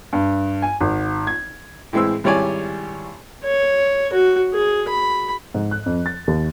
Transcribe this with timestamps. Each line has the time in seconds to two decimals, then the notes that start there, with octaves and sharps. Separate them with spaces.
0.13 G2
0.62 G#5
0.81 G#1
1.27 G#6
1.93 A2 E3 G#3 C4 E6
2.24 G#1 G3 E4 C#5 D5 G#5
3.45 C#5
4.13 F#4
4.54 G#4
4.89 B5
5.54 G#2
5.71 F#6
5.86 F2
6.06 A6
6.27 D#2